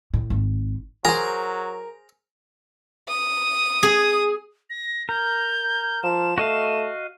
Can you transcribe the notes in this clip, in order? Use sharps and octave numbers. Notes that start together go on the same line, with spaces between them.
A2
G#1
F#3 G#4 A#4 C5 A#5
D#6
G#4
A#6
A#4 G6
F3 E7
A3 F#4 D#5 F5